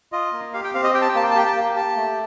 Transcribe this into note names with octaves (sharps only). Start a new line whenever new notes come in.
F4 D#5
A#3
G4 F5
G5
C4 F5
D#5
G4 G5
A5
G5
A#3 A5
G5
A5
G4 G5
A5
A#3 G5
G4 A5
A3